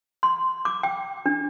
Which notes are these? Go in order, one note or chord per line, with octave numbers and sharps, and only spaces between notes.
C6
D6
G5
D4